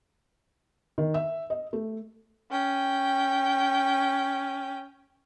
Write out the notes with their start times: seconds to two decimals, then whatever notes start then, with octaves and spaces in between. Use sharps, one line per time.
0.98 D#3
1.14 E5
1.50 D#5
1.73 A3
2.51 C#4 G5